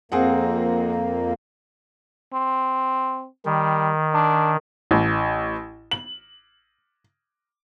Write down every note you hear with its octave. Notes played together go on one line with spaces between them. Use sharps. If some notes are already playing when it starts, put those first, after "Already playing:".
F2 A#3 C4 G#4 F#5
C4
D#3 G3
D4
A1
F#7